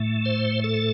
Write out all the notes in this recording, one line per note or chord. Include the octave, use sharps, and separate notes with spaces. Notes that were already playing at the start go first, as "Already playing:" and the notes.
Already playing: A2 A3
C5
A4